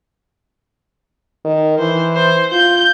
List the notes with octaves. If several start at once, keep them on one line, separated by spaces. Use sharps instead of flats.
D#3
E3 C5
C5
F4 G6